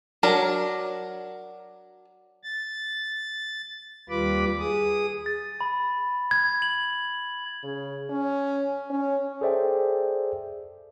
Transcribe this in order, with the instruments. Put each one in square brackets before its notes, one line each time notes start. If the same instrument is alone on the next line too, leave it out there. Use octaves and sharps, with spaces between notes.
[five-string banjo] F#3 D4 A#4
[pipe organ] A6
D#2 G3 F4 B4 B5 D6
G#4 D#6
[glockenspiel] A6
B5
G#6
F#7
[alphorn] C#3
C#4
C#4
[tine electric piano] G#4 A4 C5 D5 E5 G5